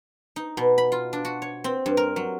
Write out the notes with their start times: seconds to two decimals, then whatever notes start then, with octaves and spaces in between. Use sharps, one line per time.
0.36 D#4
0.57 B2
0.78 B5
0.92 F4
1.13 D4
1.25 F#4
1.42 C#5
1.64 C4
1.86 G2
1.97 A#4
2.16 F#3